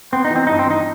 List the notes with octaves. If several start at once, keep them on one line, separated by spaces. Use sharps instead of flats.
B3 C4
D#4
E3
C4
G2 D#4
C4
E3 D#4